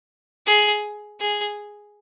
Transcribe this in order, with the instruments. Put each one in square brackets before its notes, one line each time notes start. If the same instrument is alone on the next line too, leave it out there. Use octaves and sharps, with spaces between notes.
[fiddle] G#4
G#4